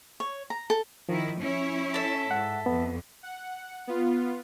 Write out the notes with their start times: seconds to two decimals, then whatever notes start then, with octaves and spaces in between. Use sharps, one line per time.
0.20 C#5
0.50 A#5
0.70 A4
1.09 D#3 F3 E4
1.40 C#4 E4 C#5
1.94 A4 E5
2.31 G#2 F#5
2.66 F2 B3
3.23 F#5
3.87 B3 F4